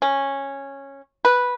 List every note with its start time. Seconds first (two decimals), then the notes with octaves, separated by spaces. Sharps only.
0.02 C#4
1.25 B4